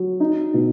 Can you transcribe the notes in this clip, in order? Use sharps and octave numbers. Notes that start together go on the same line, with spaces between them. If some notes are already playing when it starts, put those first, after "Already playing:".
Already playing: F#3
D#4
B2